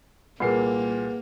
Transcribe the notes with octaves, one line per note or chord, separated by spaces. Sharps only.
C2 A#2 A#3 G#4 B4 F#5 C7